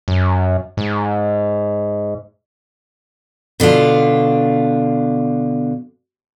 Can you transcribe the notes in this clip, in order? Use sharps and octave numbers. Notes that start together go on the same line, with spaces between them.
F#2
G#2
B2 D3 D4 F4